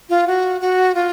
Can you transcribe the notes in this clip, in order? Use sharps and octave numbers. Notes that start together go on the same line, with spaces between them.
F4
F#4
F#4
F4